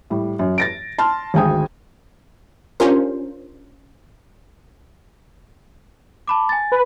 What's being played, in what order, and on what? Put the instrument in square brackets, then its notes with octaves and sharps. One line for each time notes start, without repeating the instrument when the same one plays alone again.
[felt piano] A2 G3
F#2
A6 A#6 D7
A5 C6 F6
G#1 D2 G#3 G5 G#5 D#6
[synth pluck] C#4 D4 F4 G4 A#4 C5
[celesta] A5 B5 D6
G#5 A6
[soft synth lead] B4